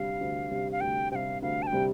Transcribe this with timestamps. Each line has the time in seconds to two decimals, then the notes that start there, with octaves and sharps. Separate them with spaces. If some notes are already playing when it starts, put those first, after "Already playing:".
Already playing: D2 C3 G3 F5
0.21 D2
0.51 C3 G3
0.72 F5
0.81 D2 G5
1.11 C3 G3 F5 G5
1.42 D2 F5
1.62 A5
1.67 G5
1.73 C3 G3